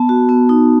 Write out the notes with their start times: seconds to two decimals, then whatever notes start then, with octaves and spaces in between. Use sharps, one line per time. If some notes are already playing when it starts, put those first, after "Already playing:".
Already playing: B3 A5
0.09 F#4
0.29 B3
0.49 D#4